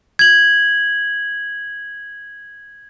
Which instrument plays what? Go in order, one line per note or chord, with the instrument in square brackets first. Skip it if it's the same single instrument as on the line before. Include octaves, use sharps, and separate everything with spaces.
[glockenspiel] G#6 F#7